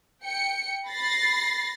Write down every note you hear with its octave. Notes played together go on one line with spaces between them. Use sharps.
G5 C#7
B5 A6 A#6 C7